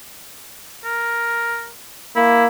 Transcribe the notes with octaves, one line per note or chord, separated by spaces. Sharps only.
A#4
A#3 E4